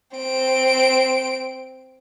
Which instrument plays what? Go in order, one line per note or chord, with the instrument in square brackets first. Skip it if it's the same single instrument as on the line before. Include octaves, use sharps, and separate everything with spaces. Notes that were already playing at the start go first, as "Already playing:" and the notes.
[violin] C4 D7